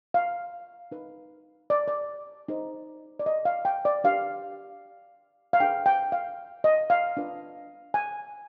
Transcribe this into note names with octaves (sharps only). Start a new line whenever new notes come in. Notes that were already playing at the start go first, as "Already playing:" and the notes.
F5
D#4 B4
D5
D5
D#4 G#4 C5
D5
D#5
F5
G5
D5
D4 G4 B4 F5
F5
D4 G#4 B4 G5
G5
F5
D#5
F5
D4 F4 B4
G#5